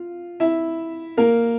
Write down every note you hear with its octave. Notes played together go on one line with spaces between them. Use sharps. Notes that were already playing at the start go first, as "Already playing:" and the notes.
Already playing: F4 F5
E4 E5
A#3 A#4